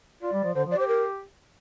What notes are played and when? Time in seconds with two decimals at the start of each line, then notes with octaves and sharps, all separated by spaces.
0.22 F4 D5
0.33 G3
0.44 F3
0.55 D3 C5
0.66 F3
0.71 D5
0.76 G4 C5
0.88 A#4